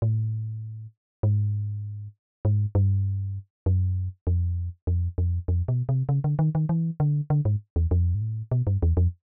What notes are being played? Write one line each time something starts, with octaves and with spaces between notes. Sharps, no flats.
A2
G#2
G#2
G2
F#2
F2
F2
F2
F2
B2
C3
C#3
D3
D#3
D#3
E3
D3
D3
G#2
E2
F2
G#2
A2
B2
G2
E2
F2